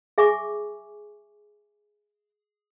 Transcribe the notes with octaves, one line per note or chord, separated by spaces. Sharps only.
G#4 E5 G#5 C#6 D6